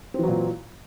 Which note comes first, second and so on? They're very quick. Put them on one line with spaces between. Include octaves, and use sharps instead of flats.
C4 E3 F#3 A#2